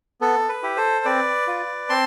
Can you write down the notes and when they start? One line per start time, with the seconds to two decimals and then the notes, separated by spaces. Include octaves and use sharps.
0.21 B3 A4
0.49 B4
0.63 E4 G4
0.77 A4 C5
1.05 C4 B4 D5
1.47 F4
1.89 C4 A5 C6